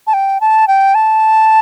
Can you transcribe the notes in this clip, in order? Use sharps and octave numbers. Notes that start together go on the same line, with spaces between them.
A5
G5
A5
G5
A5